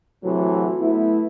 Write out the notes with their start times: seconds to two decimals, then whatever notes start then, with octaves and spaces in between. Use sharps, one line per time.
0.24 A2 C3 E3 F#3
0.80 A3 B3 E4